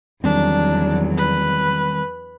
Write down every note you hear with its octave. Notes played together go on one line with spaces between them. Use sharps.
E2 D#3 F#3 G3 C4 D4
B4